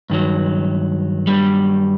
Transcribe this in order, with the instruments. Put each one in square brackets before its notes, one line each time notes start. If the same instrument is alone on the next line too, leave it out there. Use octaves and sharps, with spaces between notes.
[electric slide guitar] G2 D#3 F#3
G3